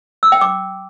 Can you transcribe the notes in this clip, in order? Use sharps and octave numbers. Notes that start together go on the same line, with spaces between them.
E6
G5
D6